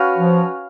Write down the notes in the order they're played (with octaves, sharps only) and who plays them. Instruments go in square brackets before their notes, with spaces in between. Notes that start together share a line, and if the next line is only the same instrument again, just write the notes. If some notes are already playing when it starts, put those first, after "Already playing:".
Already playing: [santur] C#4 F#4 B4 F5
[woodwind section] F3